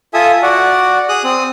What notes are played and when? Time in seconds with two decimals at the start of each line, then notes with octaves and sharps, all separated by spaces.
0.14 F4 A4 E5 G#5 D#6
0.43 F#4 D5 F#5
1.09 G#4 D#6 F#6
1.24 C4 D#6